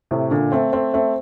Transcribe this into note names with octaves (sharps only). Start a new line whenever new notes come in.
A2 C3
A#2 D3
A3 C4
A3 C4
A3 C4